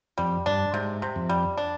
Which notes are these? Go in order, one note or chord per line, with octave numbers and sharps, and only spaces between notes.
F2 G3
G2 D4
G#2 C3
C3
F2
G3
D4